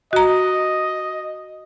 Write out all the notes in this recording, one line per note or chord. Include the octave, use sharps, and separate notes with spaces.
F#4 D#5 A#5